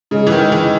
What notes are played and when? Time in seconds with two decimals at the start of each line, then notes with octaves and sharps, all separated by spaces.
0.11 C#3 G#3
0.27 E3
0.32 D#3
0.42 G#3
0.52 E3